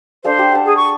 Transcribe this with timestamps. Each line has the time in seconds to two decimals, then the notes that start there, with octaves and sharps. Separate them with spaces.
0.24 D4 A4 C5 F5
0.39 G4
0.52 F#5 A5
0.65 G#4
0.77 C#6